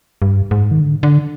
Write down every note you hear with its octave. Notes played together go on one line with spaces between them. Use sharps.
G2
G#2
D#3
D3
D3